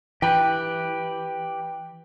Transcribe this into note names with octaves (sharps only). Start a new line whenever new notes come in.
E3 G4 B4 G5